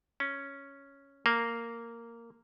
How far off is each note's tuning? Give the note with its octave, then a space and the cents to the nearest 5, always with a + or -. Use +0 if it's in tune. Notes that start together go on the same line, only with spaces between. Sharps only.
C#4 +0
A#3 -10